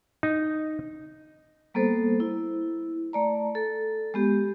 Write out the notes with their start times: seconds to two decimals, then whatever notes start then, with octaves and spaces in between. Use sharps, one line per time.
0.23 D#4
1.74 G3 A#3 B3 A4 C5
2.20 E4
3.13 A3 D5 A#5
3.55 A4
4.14 G#3 B3 G4